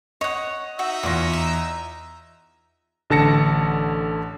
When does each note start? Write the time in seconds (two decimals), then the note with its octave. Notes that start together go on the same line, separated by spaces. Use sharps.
0.21 C#5 D#5 F#5
0.79 D#4 F#4 E5
1.03 E2 F4 D5 C#6 A#6
1.33 A#5
3.10 A1 D3 A5 A#6 C#7